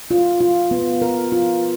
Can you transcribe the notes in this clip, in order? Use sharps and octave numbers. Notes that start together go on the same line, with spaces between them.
F4
F4
B3
A#4
F4